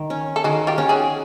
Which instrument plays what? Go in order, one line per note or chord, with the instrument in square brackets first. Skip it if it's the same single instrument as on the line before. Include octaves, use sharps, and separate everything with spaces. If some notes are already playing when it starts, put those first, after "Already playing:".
Already playing: [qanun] D#3
C#4
[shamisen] A4
[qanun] D#3 [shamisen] F#4 G#4
[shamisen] F4 G4
[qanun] C#4
[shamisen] F#4 G#4